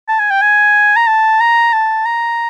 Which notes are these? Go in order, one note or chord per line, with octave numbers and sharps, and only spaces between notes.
A5
G#5
G5
G#5
A#5
A5
A#5
A5
A#5